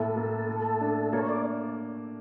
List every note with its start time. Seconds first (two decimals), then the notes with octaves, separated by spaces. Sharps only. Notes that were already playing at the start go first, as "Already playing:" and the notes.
Already playing: A2 A#3 A4
0.16 A#3
0.47 A3
0.81 D4
1.12 A#3 C#5
1.29 D5